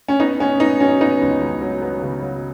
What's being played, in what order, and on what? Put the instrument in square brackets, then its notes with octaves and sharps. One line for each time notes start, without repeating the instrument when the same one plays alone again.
[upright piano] C#4
[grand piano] B3 [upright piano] D#4
[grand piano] B3 [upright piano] C#4
[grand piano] B3 [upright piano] D#4
[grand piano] F#3 [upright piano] C#4
[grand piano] B3 [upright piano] D#4
[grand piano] C#2
C#2
F#3
B3
C#3
F#3